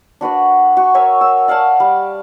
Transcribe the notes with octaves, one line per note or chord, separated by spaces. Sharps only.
D4 F#4 B4 D5
F#4 C#6
A#4 C#5 E5 G#5
E6
D5 F5 F#5 A5
G3